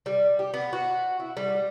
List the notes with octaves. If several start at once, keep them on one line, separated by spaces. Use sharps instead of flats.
G3
G4
B3
F#4
E4
G3